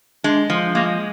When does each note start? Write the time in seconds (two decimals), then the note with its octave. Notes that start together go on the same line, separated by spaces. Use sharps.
0.24 G#3 D4
0.50 F3
0.75 G#3 A#3